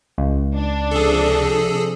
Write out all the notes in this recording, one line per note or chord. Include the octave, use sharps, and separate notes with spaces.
C#2
D4
C3 F3 G#4 A4